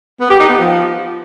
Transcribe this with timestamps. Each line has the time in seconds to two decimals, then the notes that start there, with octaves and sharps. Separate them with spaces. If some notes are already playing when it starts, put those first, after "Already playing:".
0.20 B3
0.30 G4
0.39 D#4
0.49 B3
0.59 F3